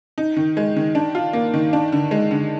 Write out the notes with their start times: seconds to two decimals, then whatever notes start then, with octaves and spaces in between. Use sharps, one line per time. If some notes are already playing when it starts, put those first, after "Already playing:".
0.18 D#4
0.37 D#3
0.57 G#3
0.76 D#3
0.95 D4
1.15 F4
1.33 A#3
1.54 D#3
1.73 D4
1.93 D3
2.11 G#3
2.31 D3